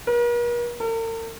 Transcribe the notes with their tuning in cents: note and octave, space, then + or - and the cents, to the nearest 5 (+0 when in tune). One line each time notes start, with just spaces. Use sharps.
A#4 +45
A#4 -45